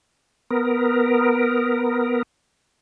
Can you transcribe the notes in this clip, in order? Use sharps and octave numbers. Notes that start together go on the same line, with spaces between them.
B3 A#4